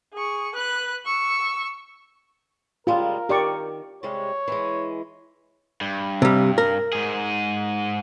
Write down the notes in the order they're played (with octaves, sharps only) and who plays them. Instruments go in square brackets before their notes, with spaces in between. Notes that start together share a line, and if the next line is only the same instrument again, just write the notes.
[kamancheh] G#4 C#6
B4 F#6
C#6 E6
[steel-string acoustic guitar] C#3 G3 G#3 [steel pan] F4 [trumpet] A#4
[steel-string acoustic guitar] D#3 [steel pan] G4 D5 C#6
[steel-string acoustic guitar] C3 G3 G#3 [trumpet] C#5
[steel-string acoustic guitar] E3 G#3
[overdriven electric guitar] G2
[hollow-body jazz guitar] C3 G3
A#4
[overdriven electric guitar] G#2 G#4